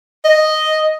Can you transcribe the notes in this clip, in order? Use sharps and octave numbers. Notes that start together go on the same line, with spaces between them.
D#5